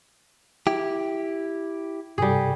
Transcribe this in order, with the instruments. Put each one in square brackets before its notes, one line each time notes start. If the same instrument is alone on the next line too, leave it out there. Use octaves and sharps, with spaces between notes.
[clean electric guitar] E4 G4
[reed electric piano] G2 C3 A4 [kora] G3 G#4